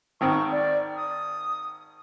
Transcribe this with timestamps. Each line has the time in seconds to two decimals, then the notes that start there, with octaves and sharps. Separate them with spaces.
0.21 G#1 D#3 C4 C#6
0.52 D5
0.96 D#6